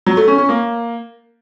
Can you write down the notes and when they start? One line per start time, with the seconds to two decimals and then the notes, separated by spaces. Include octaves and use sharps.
0.06 F#3
0.17 A3
0.28 C#4
0.38 C#4
0.49 A#3